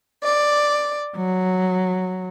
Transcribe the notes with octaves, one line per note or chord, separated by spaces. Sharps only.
D5
F#3